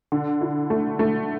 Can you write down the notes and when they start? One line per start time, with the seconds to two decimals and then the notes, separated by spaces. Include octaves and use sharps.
0.12 D3
0.41 E4
0.70 A3
0.99 A3